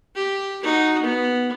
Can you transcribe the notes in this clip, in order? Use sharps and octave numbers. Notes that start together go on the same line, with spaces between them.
G4
D#4 F#4
B3